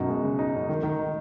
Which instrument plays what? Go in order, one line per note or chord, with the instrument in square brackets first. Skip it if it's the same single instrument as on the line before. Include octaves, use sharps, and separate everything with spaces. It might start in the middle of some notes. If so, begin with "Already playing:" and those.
Already playing: [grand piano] F#2 B2 D#4
G#3
C#3
D#4
F#2
D#3
D#3
D#4